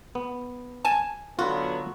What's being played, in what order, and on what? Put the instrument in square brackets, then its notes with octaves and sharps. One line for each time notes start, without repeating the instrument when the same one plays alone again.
[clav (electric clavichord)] B3
[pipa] G#5 A5
[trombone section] D3 F#3 B3 [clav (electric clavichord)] F4 B4 [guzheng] F#4